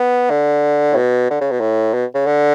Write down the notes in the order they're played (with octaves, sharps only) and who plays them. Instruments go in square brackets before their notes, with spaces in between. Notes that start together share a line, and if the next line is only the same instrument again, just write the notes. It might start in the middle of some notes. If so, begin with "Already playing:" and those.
Already playing: [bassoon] B3
D3
A2
B2
D3
C#3
B2
A2
B2
C#3
D3